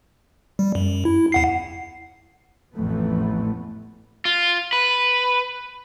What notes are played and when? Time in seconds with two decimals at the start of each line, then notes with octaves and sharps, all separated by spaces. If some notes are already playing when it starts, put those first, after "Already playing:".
0.59 G3
0.75 F#2
1.05 E4
1.32 E2 F#5 C7
2.75 A1 F2 A2 E3 A3 B3
4.25 F4
4.73 B4